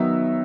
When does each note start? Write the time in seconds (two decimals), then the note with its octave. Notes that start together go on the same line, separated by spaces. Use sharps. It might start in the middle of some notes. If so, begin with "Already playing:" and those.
Already playing: D#3 F#3 B3 D#4 E5